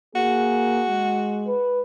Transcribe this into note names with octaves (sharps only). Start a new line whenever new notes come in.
A#3 F#4 G#4
G#3
B4